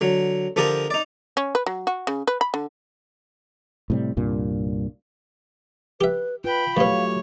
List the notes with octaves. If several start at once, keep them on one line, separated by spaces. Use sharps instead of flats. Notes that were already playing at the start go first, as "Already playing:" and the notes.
D3 F#3
D3 F3 G4 A4 A#4 D#6
D#4 D5
C#4
B4
F#3
F#4
C#3
B4
B5
D3
A2 C3 G3
C2 G2 A#2
G4 B4 E5
F4 B4 G5 B5
F#2 B2 F#3 A3 G4 C#5 F5